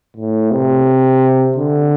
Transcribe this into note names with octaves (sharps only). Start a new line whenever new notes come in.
A2
C3
D3